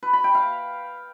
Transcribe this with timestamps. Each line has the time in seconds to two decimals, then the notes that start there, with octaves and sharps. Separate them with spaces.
0.03 B4
0.13 B5
0.24 G5
0.35 F5